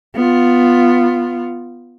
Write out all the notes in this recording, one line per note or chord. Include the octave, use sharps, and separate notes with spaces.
B3 F4